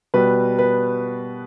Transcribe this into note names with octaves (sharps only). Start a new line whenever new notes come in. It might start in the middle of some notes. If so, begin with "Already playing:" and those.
B2 G3 B4
B4